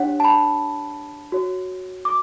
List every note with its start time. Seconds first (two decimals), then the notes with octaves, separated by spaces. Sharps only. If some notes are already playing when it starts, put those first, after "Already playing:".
Already playing: D4 G4 C#5 F#5
0.20 A5
0.25 B5
1.32 F#4 C#5
2.05 D6